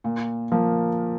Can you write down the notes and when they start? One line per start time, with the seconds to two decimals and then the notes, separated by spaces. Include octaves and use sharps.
0.04 A#2
0.51 F3 A#3